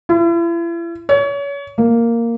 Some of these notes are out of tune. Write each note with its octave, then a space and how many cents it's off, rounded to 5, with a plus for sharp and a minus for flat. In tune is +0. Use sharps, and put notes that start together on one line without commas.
E4 +40
C#5 +30
A#3 -5